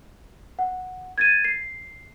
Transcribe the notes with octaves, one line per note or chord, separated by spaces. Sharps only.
F#5
G#6 A6 D#7
C7